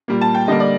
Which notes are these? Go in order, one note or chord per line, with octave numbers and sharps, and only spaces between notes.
A#2 G3 A#3
A5
G5
D3 G3 A#3 D#5
D5